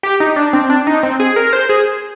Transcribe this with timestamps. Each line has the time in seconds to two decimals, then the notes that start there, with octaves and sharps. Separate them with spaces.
0.03 G4
0.20 D#4
0.36 D4
0.53 C4
0.70 D4
0.87 D#4
1.03 C4
1.20 G#4
1.36 A#4
1.53 C5
1.69 G#4